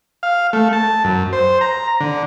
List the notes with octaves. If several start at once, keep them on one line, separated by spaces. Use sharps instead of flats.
F5
A3
A5
F#2
C5
A#5
D3